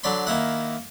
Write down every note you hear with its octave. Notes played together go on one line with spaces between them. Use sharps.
D3 F#3 D5 B5 C6
D#3 A#3 E4 F#5